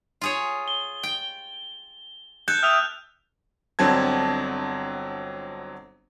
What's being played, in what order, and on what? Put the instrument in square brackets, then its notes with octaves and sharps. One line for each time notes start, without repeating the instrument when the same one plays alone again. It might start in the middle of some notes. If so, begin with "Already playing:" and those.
[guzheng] F4 G#4 C#5
[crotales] G7
[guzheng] G5
[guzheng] A4 [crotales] F#6 G6
[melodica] E5 G5 D#6 [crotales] F6 F7
[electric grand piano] G1 D3 F#3 C4 A5 G#6